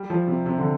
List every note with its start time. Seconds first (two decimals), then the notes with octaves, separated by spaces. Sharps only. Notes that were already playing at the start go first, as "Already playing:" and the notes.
Already playing: G3
0.10 F3
0.28 C3
0.46 C3
0.58 D3